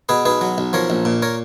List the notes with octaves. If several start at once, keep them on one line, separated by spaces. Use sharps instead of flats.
B2 G#4 B4
B1 G#4 B4
F#3
B1
F3 A#4 C#5
A#1
A#2
A#4 C#5